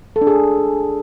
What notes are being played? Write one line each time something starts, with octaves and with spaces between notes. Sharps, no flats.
A4
D4
G#4